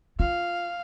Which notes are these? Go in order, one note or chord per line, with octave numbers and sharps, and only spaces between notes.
F4 F5